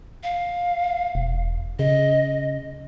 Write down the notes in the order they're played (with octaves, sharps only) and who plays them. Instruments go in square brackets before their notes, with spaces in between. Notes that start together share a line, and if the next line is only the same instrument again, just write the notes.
[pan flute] F5
[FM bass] E1
[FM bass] C#3 [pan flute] D#5